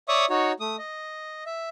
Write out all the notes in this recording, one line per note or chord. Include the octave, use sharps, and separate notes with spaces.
C#5 D5 E5 C#6 D#6
D#4 F#4 C#5
A3 D#6
D#5
E5